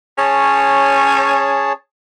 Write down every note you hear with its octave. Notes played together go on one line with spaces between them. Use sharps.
C#4 G#4 C#5 A5